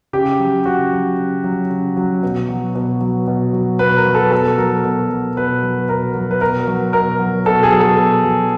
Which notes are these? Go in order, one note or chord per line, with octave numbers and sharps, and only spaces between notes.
C#3 G4
F#3
C#3 F#4
F#3
C#3
F#3
C#3
F#3
B2
F#3
B2
F#3
B2
F#3
B2 B4
A#4
F#3
A4
B2 A4
F#3 A#4
B2
F#3
B2 B4
F#3
B2 A#4
F#3
B4
B2 A#4
F#3
B2 A#4
F#3
B2 A4
G#4
F#3
A4
B2
F#3